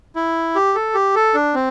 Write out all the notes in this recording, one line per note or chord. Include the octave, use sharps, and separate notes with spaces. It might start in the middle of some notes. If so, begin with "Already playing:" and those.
E4
G4
A4
G4
A4
D4
C4